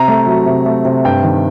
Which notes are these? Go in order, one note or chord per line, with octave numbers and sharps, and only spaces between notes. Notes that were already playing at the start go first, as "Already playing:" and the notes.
Already playing: C3 A#5
A3
F#3
C3
A3
C3
G2 G5
D#3